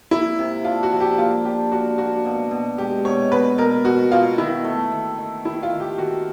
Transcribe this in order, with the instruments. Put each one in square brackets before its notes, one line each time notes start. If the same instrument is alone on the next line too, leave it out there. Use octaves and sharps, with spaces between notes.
[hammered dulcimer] A#3 [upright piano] E4
[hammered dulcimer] C3
[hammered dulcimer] D4 [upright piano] F4
[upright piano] F#4
[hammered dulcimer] F3
[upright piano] G4
[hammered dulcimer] A#3 [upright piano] F4
[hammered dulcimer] D4 [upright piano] G4
[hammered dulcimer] D4 [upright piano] F#4
[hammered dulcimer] A#3 [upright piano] F#4
[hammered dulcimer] B2
B2
[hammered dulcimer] G#3 [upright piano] G4
[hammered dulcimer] B2 [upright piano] C#5
[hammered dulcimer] B2 [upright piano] B4
[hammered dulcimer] B2 [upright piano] A#4
[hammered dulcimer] B2 [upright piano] F#4
[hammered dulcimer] B2 [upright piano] F4
[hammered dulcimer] D#3 [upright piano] E4
[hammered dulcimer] A3
D#3
D#3
[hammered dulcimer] D#3 [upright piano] E4
[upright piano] F4
[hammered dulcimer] D#3
[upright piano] G4
[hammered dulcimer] D#3 [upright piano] F#4